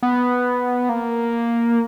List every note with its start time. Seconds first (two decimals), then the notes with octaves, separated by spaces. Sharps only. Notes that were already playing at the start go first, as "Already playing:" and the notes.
0.03 B3
0.89 A#3